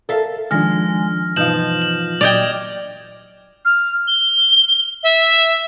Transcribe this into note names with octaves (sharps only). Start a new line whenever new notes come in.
A4 A#4 E5 F5
D#3 F3 G#3 D4 F6 A#6
G2 B2 E3 F3 D#4 G6 E7 F#7
F#7
A#2 F#3 D5 D#5 G5 G#6 F7
F6
G7
E5